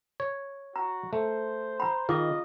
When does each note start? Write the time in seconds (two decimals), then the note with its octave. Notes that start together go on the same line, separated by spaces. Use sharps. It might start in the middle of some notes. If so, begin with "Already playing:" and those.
0.20 C#5
0.76 F#4 A#5
1.13 A3 C5
1.80 A#5 B5
2.09 D#3 F4 G#4 D#5 D6